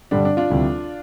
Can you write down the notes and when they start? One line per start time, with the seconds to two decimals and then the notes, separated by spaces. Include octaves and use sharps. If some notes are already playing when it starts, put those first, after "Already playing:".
0.11 G2 D3 G3 D4
0.25 D4
0.37 D4 F4
0.50 D2 C3 E3 G3